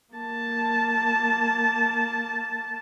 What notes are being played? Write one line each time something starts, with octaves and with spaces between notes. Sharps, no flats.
A#3 A5